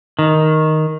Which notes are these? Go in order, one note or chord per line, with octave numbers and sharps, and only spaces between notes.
D#3